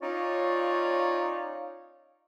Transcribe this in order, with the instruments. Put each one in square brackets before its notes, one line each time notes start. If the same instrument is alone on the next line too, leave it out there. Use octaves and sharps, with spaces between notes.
[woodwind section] C#4 D#4 F4 C#5 D5 F5